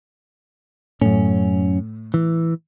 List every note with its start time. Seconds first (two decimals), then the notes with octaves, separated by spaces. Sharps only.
1.01 F#2 A2 C#4
2.14 E3